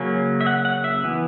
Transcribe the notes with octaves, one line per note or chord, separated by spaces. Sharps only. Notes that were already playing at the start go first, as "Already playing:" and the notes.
Already playing: C#3 F#3 A#3 C#4
E5
F#5
F#5
E5
E3 B3